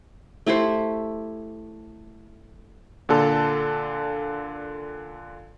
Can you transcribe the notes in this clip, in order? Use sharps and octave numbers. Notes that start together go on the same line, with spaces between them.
A3 E4 G4 C5
A#2 D3 A4